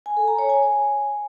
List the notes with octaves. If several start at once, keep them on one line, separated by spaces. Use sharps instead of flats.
G#5
A4
A#5
C#5
G#5